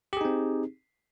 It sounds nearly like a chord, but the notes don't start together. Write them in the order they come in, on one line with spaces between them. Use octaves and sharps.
G4 G#4 D#4 C4